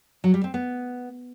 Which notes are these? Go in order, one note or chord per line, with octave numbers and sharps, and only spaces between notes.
F#3
G3
C4
B3